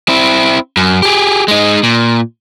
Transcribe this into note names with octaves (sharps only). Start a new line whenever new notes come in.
C4 E4
F#2
G4 G#4
G#3 D#4
A#2